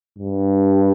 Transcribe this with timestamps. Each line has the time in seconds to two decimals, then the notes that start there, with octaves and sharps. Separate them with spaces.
0.19 G2